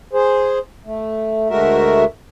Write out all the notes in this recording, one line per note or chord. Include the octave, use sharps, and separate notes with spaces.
G#4 C5
A3
D2 G#3 A3 F#4 A#4 E5